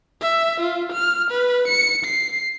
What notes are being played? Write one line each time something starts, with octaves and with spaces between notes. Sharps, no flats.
E5
F4
F6
B4
C#7
C7